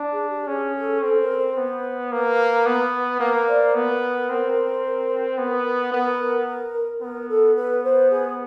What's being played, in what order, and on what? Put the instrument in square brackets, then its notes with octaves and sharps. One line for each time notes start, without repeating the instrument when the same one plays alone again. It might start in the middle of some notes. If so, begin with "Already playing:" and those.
Already playing: [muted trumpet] D4
[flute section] G#4
G4
[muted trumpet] C#4 [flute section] G#4
[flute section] A4
[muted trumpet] C4 [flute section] A4
[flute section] A#4
C5
[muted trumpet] B3
[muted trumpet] A#3 [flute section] B4
[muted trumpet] B3
[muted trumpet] A#3 [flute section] B4
[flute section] C5 D5
[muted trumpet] B3 [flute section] A#4
[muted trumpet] C4
B3
[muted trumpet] B3 [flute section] A#4
[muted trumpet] B3 [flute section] A#4
[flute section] A4
B4
C5
G#4